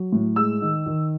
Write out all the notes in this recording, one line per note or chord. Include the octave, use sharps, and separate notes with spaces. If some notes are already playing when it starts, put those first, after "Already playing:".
Already playing: F#3
A2
G#3 E6
D#3
D#3